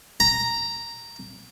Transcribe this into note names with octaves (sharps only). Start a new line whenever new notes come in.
A#5